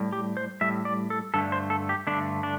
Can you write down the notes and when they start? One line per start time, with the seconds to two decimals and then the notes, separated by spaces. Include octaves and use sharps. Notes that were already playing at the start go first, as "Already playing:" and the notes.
Already playing: A2 G3
0.13 G4
0.37 C5
0.61 A2 G3 E5
0.85 D5
1.10 A4
1.34 G2 D3 A3 A4
1.52 C5
1.70 A4
1.89 G4
2.07 G2 D3 A3 D4
2.43 D4